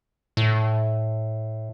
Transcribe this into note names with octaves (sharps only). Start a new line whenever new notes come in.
A2